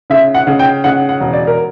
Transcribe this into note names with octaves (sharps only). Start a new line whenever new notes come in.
C#3 E5
F#5
C#3
G5
C#3 F#5
F#5
E1
D5
A#4